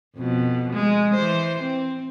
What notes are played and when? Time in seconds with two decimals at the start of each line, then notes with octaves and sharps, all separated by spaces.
0.17 F2 B2
0.73 G#3
1.15 E3 C5
1.61 C4